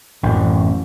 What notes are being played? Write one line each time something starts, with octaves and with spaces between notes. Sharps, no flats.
A1 F#2